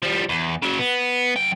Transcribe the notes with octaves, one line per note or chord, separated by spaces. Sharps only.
F3 G3
E2
C#3 F#3
B3
F#2 G5